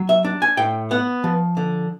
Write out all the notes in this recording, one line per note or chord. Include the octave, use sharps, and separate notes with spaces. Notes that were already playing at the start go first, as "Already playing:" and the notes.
Already playing: F#3
E5
D4
G#5
A2 G5
B3 F#5
F3
D3